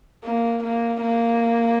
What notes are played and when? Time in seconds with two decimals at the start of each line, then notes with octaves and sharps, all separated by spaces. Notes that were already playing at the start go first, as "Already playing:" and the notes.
0.24 A#3
0.64 A#3
1.02 A#3